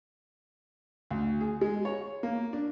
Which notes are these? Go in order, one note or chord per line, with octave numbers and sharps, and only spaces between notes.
D2
G#4
G#3
C#5
A#3
D4